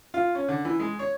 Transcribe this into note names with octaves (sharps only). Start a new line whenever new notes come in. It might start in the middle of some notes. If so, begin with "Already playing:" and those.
F4
C#4
D3
E3
G#3
C#5